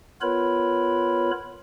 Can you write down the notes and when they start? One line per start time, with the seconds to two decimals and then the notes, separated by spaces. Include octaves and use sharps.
0.21 B3 F4 A#4 B4 C#5 B5